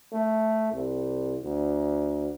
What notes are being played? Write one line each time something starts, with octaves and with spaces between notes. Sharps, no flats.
A3
C2
D2